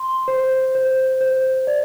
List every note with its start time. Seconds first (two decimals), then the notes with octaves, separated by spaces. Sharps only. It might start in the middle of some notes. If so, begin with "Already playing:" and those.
Already playing: C6
0.28 C5
0.75 C5
1.21 C5
1.67 D5